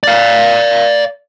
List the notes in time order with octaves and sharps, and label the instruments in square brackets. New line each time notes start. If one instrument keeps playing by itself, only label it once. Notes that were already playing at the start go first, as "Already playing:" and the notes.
[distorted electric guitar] D5 F5